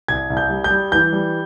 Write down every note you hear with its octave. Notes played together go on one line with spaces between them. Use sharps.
C2 G#6
C2
G6
G3
G6
G3
E3 G6
G3